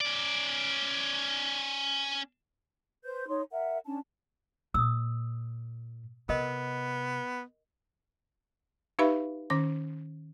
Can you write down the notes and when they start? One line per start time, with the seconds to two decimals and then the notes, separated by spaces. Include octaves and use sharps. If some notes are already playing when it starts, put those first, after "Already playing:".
0.01 C#4 D5
3.04 B4 C5 G6
3.28 D#4 C#5 C6
3.51 A#4 E5 F#5
3.85 C#4 D4 A5
4.74 A#2 D#6 E6
6.29 C3 B3 A#4 D#5
8.99 D#4 G4 B4 E5 F5 B5
9.50 D#3 C#4 D6